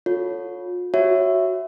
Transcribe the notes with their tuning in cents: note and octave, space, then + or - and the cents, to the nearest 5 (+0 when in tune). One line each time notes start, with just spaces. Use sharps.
F4 +40 A4 +0 C#5 +0
F#4 +0 C#5 +0 E5 +0